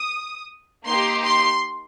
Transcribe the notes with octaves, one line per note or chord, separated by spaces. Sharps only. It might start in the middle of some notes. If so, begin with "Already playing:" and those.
Already playing: D#6
A#3 D#4 G4 C6
C6